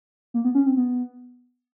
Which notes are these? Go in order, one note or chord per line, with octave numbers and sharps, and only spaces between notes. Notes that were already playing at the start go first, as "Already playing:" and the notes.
A#3
B3
C#4
C4
B3